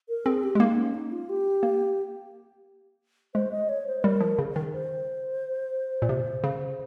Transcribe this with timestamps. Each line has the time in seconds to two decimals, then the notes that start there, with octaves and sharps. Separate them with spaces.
0.09 A#4
0.26 C4 G#4
0.43 G4
0.55 G#3
0.60 A#3 D#4
0.78 C#4
0.95 D#4
1.12 F4
1.29 G4
1.63 A#3
3.34 G#3 C5
3.52 D#5
3.69 C#5
3.87 C5
4.03 G3 A#4
4.21 F3
4.39 C#3
4.56 D#3
4.73 C5
6.02 A#2
6.09 C3
6.44 C#3